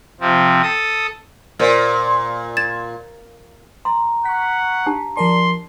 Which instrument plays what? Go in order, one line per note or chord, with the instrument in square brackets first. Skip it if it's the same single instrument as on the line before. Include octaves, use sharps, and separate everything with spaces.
[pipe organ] C3 F3 C4
A4 D#6
[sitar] A#2 [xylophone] A#4 C5 D5
[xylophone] G#6 A6 E7
[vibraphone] A#5 [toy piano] C6
[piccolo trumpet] F#5 [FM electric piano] C#6 B6
[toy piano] D4 G4 A5
[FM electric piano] F3 A#4 D5 [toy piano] A5 [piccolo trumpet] C6